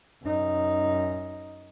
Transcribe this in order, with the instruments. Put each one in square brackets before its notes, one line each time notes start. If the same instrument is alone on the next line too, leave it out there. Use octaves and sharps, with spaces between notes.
[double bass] F#2 D#4